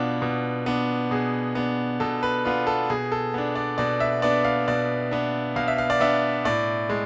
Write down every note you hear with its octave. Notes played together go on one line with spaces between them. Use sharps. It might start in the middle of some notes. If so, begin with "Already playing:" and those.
Already playing: B2 B3 D4 F4
B2
B3 D4
B2 G#4
B3 D4
B2 A4
B4
B3 D4 F4
A4
B2 G#4
A4
B3 D4
D5
B2 D5
E5
B3 D4 D5
F5
B2 D5
B3 D4
B2 F5
E5
F5
D5
B3 D4 E5
A2 D5
G#3